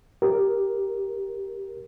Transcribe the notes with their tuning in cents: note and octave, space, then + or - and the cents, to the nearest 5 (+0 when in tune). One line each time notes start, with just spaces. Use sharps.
G4 +0 A#4 +10